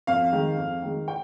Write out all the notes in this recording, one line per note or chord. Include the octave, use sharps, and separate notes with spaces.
F2 F5
D#3 G#3
F2
D#3 G#3
G5